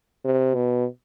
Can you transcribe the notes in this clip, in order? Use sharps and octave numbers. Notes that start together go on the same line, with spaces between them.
C3
B2